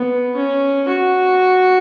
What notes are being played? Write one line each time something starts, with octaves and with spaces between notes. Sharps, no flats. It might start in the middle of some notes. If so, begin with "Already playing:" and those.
Already playing: B3
C#4
F#4